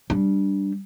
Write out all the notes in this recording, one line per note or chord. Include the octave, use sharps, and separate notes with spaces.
G3 D4